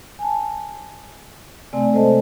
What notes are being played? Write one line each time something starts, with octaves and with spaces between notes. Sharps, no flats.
G#5 A5
C3 A3 C4 D5 G#5
G#3 A4 C5 D#5 A5